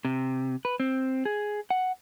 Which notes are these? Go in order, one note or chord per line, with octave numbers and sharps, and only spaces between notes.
C3
B4
C4
G#4
F#5